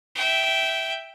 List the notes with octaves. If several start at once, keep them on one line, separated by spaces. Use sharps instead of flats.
E5 G5